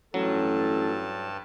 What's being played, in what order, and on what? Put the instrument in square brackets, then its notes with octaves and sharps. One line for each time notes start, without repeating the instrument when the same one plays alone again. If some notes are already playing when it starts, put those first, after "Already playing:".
[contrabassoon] A1 [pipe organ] G2 A5 [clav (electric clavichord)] F#3 [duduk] A4